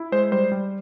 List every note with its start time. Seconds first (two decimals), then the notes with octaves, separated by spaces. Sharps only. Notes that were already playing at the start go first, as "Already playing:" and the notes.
Already playing: E4
0.12 G#3 C5
0.32 G3 C5
0.52 G3